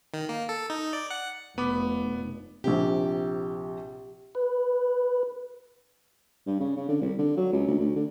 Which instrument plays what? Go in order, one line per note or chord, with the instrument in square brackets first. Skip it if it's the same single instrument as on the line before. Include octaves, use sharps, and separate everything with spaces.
[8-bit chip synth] D#3
A#3
A4
D#4
D5
F#5
[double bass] F1 [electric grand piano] B3 B5 D6
[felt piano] A#1 C3 [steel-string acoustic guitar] G4
[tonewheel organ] B4
[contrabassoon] G2
C#3
C#3
D3
C2
D3
F#3
C#2
D2
D2
D3